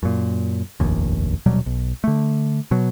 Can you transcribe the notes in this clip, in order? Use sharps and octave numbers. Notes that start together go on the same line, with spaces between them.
F#2 A#2
F1 A#1 D#2
D#1 B2 F#3 G3
B1
D3 A3
B2 F#3